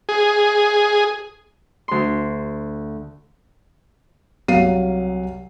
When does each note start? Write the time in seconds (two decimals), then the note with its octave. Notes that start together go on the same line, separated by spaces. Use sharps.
0.09 G#4
1.88 D2 C6
4.48 C2 F#3 F5 C7 D#7